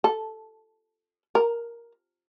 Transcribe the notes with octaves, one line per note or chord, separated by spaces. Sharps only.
A4
A#4